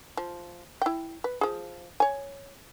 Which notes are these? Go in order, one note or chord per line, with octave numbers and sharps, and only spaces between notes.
F3
E4 G5
B4
F3 G#4
C#5 G#5